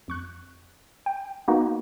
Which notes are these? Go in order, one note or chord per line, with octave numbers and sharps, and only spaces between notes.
F2 C#6 F#6
G5
A#3 B3 D#4 F#4